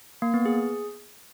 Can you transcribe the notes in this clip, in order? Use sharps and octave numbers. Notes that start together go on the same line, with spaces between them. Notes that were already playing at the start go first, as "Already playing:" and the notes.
A#3
B3
G#4